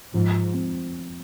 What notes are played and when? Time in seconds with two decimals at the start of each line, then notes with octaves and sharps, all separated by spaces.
0.14 G#2 F3
0.53 C4